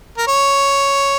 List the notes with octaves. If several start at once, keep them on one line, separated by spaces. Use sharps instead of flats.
A#4
C#5